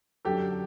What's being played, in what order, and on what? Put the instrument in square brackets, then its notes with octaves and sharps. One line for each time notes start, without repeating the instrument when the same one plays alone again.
[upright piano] F#2 D3 F#3 G4 A4